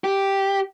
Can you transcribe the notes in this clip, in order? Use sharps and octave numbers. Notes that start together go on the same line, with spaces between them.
G4